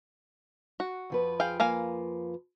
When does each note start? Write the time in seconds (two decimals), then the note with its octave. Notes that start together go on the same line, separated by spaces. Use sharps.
0.80 F#4
1.10 F2 F3 B4
1.40 G#4 F5 G5
1.60 A#3 F5 G#5